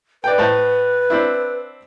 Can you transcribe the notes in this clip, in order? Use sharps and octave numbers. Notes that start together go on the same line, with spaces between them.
B4 D5 G5
A2 C5 A5
C4 D4 E4